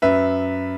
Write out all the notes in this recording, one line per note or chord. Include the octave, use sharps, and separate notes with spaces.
F#2 B4 E5